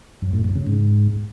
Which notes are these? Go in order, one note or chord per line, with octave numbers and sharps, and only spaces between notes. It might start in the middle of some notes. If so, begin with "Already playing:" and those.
F#2
A2
F#2
C#3
G#2